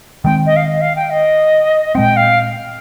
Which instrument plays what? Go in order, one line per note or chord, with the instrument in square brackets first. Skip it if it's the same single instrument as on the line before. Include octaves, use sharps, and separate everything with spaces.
[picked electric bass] D#3 G#3 C4 [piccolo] G5
[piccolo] D#5
F5
D#5
F5
G5
D#5
[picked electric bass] A#2 G#3 C4 [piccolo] G5
[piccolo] F5